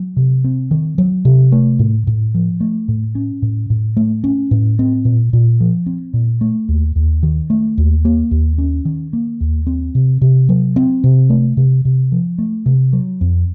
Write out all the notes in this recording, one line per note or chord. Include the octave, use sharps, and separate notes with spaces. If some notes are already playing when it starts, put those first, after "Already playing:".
Already playing: F#3
C3
C4
D#3
F#3
C3
A3
A2
A2
F3
A3
A2
C#4
A2
A2
A3
C#4
A2
C4
A#2
A#2
F3
C4
A#2
A3
D#2
D#2
D#3
A3
D#2
A#3
D#2
C#4
D#3
A#3
D#2
C4
C3
C3
F#3
C4
C3
A3
C3
C3
F3
A3
C3
F#3
F2